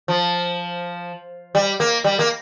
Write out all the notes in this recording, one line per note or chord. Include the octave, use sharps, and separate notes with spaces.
F3
G3
A#3
G3
A#3